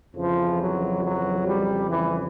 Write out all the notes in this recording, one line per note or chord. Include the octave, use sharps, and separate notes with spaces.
F2 C#3 E3 F3
F#3
F#3
G3
E3